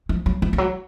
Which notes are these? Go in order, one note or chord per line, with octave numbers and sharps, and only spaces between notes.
F3
F#3
F3
F3
F#3